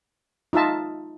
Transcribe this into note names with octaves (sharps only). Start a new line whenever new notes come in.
D#4 F4 E5 A5